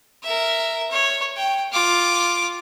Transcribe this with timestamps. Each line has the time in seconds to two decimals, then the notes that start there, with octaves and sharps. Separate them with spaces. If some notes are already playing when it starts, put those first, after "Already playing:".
0.23 A#4 E5
0.91 C#5
1.36 G5
1.72 F4 D6